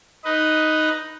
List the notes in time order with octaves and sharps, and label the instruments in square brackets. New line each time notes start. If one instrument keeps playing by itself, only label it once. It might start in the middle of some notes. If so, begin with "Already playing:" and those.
[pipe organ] D#4 B4 D#5